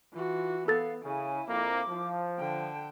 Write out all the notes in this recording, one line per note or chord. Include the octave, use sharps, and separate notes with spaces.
E3 F4 F#4
B3 A4 F5 A6
C#3 E4 G#5
F2 A#3 D6
F3
D3 G5 A5